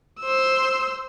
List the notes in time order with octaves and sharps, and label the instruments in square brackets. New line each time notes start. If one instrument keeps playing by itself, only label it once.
[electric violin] C5 E6